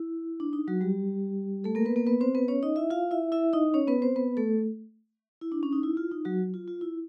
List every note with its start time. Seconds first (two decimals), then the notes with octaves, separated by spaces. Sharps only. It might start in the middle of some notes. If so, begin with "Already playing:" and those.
Already playing: E4
0.40 D4
0.53 D#4
0.68 F#3 F#4
0.81 G3 G4
1.64 A3 A4
1.75 A#3 A#4
1.85 B3 B4
1.96 A#3 A#4
2.07 B3 B4
2.21 C4 C5
2.35 B3 B4
2.48 C#4 C#5
2.63 D#4 D#5
2.76 E4 E5
2.90 F4 F5
3.11 E4 E5
3.32 E4 E5
3.53 D#4 D#5
3.74 C#4 C#5
3.88 B3 B4
4.02 C4 C5
4.16 B3 B4
4.37 A3 A4
5.42 E4
5.52 D4
5.63 C#4
5.72 D#4
5.83 E4
5.97 F4
6.12 D#4
6.25 F#3 F#4
6.54 F4
6.68 F4
6.81 E4